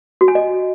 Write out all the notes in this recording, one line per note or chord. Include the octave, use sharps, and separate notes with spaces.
F#4
G#5
D#5